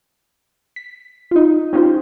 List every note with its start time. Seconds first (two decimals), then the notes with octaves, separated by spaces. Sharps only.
0.76 B6
1.31 D#4 F4
1.73 C4 C#4 D#4 F4 G4 C5